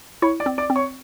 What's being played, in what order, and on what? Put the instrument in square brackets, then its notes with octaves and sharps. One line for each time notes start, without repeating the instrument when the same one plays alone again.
[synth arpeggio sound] E4 [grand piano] C#5 C#6
[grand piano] D5 D6
[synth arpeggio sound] C4
[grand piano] D5 D6
[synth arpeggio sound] C4
[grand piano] C#5 C#6